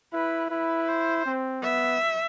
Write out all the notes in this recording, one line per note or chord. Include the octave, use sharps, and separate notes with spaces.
E4 B4
E4 B4
C5
C4
B3 E5